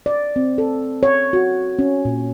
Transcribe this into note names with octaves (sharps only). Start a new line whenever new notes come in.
D5
C4
A4
C#5
F#4
C#4
A#2